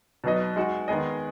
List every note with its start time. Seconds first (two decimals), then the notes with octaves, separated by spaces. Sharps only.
0.24 B2 F#3 D#4 B4 D#5
0.56 G#3 D#4 F#4
0.88 D#3 G#3 B3 G#4 D#5